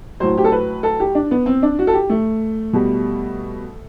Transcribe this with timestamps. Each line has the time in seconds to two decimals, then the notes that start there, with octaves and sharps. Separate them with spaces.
0.20 A2 F#3 C5
0.38 G4
0.44 A4
0.52 B4
0.83 A4
1.00 G4
1.15 D4
1.31 B3
1.46 C4
1.63 D4
1.79 F#4
1.87 A4
1.93 G4
2.09 A3
2.73 B2 G3